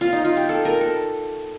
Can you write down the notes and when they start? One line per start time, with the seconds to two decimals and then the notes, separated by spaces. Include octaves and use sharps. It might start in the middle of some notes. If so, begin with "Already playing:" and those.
0.01 F4
0.13 D#4
0.25 F4
0.37 G4
0.49 A4
0.65 A#4
0.81 A4